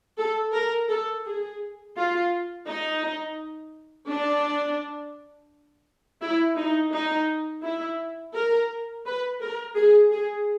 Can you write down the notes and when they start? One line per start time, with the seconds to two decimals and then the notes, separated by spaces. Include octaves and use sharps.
0.18 A4
0.54 A#4
0.89 A4
1.25 G#4
1.97 F4
2.67 D#4
4.09 D4
6.22 E4
6.57 D#4
6.93 D#4
7.64 E4
8.35 A#4
9.06 B4
9.42 A#4
9.76 G#4
10.12 G#4